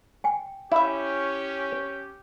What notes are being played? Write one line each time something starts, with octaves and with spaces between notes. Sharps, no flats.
G5 G#5
C#4 E4 G4 E5